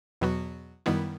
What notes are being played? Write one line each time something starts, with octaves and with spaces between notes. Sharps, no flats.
E2 B2 F#3 B3 F#4
F#2 D#3 G3 B3 E4